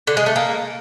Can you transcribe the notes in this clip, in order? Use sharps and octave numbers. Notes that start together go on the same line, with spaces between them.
D3
G#3
A3
A#3